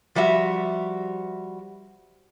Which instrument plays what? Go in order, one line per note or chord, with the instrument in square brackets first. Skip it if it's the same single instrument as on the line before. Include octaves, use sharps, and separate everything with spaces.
[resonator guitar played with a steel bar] F3 G3 F#4 E5